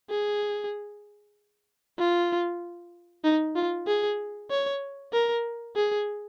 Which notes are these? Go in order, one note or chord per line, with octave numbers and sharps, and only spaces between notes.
G#4
F4
D#4
F4
G#4
C#5
A#4
G#4